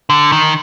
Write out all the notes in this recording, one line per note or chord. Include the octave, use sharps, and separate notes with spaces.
D3
D#3